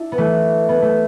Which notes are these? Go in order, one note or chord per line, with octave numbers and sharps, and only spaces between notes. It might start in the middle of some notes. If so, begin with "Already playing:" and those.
Already playing: D4 E4
B3
E3 A3
B3
A3